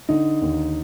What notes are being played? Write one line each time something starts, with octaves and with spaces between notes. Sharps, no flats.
D3 D#4
D#2